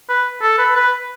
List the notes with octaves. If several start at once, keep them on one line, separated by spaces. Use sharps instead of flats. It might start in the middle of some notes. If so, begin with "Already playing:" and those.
B4
A4
B4
B4